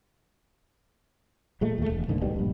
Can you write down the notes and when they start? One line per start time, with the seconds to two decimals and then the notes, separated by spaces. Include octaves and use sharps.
1.61 A#2 G#3 A3
1.78 D#2 A3
1.90 E1
2.08 C2 G#2 D3 A#3
2.21 D1 D#2 B2 G3
2.36 A#1 G2